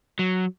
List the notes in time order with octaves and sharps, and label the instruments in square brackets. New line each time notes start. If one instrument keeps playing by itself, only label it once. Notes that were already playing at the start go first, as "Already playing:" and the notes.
[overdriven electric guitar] F#3